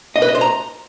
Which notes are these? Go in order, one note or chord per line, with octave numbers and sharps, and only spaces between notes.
D#5
B4
D#5
C5
A#5